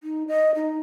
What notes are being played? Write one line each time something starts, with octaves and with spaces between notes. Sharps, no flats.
D#4
D#5
D#4